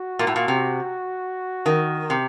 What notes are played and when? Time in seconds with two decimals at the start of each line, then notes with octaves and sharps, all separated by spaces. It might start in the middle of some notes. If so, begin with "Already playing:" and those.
Already playing: F#4
0.19 A#2
0.27 A2
0.36 A#2
0.48 C3
1.66 D#3
2.10 C3